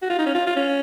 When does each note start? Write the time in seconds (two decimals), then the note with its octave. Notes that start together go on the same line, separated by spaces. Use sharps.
0.02 F#4
0.10 F4
0.19 D#4
0.26 C#4
0.35 F4
0.46 F4
0.56 C#4